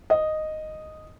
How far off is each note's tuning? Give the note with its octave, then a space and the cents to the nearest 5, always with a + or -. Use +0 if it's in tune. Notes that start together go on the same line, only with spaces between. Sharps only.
D#5 -5